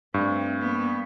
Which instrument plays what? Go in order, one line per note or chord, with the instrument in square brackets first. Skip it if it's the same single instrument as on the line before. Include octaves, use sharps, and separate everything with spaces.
[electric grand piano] G2 [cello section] A3 C4
[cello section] A#3 B3